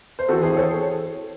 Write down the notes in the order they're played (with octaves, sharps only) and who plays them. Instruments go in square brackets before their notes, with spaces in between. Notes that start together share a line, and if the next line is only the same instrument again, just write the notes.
[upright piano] C5
E3 C4 F#4 A4
G#4 C5
A4 C#5